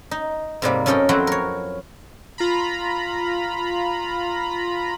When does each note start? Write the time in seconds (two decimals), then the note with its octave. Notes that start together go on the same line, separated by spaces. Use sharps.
0.11 D#4
0.62 G#2 C3 G3 A#3
0.86 F#2 C#4 A4 A#4 D#5 G5
1.09 F2 F#3 C4 E4 F#4 A#5
1.27 A#4 C#5
2.38 F4 A#5 B5